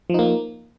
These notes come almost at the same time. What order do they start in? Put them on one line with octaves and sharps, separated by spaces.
F3 D#4 A#3